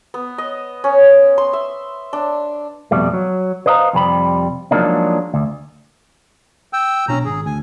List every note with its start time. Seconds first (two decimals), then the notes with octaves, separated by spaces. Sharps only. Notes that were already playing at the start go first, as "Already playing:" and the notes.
0.14 B3
0.38 D#5
0.84 C#4
1.38 C6
1.53 E5
2.13 D4
2.91 F2 G#2 B2 G3 A3
3.14 F#3
3.66 B4 C5 D#5 F5 G#5 A#5
3.93 F2 C3 G3 B4 B5
4.71 F3 F#3 G#3 A#3 D4 D#4
5.34 D2
6.73 G5 E6
7.08 B1 B2 C#4 D4 A#5
7.25 G#1 G#4
7.46 D2 G#5